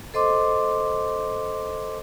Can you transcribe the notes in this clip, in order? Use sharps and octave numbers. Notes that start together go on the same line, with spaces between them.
A4 C5 D#5 C6 D6